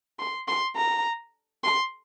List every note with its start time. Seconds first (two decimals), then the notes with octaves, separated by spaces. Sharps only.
0.19 C6
0.48 C6
0.77 A#5
1.64 C6